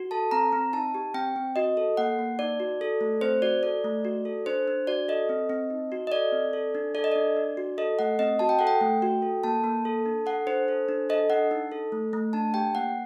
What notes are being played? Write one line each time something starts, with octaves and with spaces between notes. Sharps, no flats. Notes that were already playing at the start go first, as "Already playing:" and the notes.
Already playing: F#4
A4 A5
C4 A#5
C4
D#4 A5
G4
C4 G5
C4
F#4 D#5
A4
A#3 F#5
A#3
D#4 D5
F#4
A4
A3
C4 C5
F#4 D5
A4 D5
A3
F#4
A4
D4 C5
D4
F#4 D5
A4 D#5
C4
C4
D#4
F#4
D#5
A4 D5
C4
A4
D4
A4 D5
D#5
D4 D5
D4
F#4
A4 D#5
A3 F#5
C4 D#5
F#4 A5
G5
A4 F#5
G5
A3
F#4
A4
A#3 A5
A#3
A4
D4
A4 F#5
D4 C5
A4
D4
A4 D#5
D4 F#5
D#4
A4
A3
A3
D4 A5
G4 G5
A#3 F#5